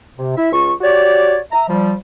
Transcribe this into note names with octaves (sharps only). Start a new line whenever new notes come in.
C3
E4 E5
C#2 F4 C#6
F#4 G4 C#5 D5
E5 A#5
F3 G3